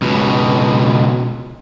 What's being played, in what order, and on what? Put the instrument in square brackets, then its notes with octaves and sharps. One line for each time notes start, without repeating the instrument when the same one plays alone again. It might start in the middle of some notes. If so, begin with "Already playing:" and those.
[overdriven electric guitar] C#2 B2